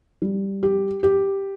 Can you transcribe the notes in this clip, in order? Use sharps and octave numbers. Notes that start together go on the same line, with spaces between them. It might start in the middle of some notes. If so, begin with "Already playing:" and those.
G3
G4
G4